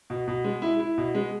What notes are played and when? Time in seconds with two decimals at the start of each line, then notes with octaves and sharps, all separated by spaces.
0.10 B2
0.28 B2
0.44 G#3
0.62 E4
0.80 E4
0.98 B2
1.15 G#3